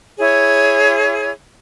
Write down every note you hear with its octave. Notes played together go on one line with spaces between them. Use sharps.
E4 G#4 C#5